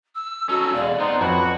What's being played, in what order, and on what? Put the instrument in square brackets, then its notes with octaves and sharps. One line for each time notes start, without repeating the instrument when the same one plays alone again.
[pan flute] E6
[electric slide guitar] C#4 D#4 [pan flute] F#4 [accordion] A4 E6
[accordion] E2 G#3 F5 [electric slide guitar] B2 [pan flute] D5
[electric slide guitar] B3 C4 [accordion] D#4 C5
[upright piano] F2 [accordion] F#3 B4 [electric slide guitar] F#4